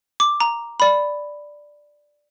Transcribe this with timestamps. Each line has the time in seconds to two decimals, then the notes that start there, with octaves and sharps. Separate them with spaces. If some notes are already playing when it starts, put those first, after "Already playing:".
0.20 D6
0.40 A#5
0.80 D5 B5